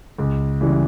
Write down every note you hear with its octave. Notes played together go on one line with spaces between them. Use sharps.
C#2
C#3 E3 G3